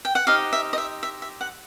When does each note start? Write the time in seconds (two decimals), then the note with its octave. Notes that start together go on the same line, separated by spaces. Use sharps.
0.05 G5
0.15 F#5
0.27 D#4 G4 C5 D#5 F5
0.53 E5
0.73 D#5
0.78 E5
1.03 E5
1.22 E5
1.41 F#5